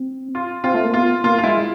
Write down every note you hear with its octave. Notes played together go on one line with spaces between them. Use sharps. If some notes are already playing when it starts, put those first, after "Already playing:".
Already playing: C4
F4
C4 F4
A3
A#3
B3 F4
A#3 F4
F4
G#3 E4